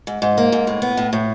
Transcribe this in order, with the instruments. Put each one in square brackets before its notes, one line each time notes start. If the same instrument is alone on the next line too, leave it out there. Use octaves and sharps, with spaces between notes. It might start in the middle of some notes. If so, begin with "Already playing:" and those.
[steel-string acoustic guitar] G#2
G#2
A#3
G#2
A2
B3
A2
A2